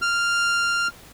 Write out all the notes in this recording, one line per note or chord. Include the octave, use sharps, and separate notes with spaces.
F6